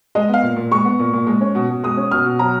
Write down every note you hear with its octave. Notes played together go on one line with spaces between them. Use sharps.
G#3 D#5
B3
F5
A#2
A#2
G#3 C#6
B3
A#2
A#2
G#3
C#4
B2
B2
G#3 D#6
C#4
B2 F6
B2
F#3 A#5